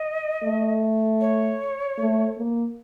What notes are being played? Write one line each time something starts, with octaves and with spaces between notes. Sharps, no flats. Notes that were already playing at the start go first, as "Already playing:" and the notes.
Already playing: D#5
A3
C#5
A3
A#3